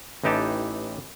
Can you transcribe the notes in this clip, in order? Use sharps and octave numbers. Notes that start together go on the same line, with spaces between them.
A1 E3 D#4 G4 A5